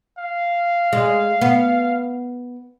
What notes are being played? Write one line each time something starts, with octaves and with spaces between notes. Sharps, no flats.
F5
G#3
B3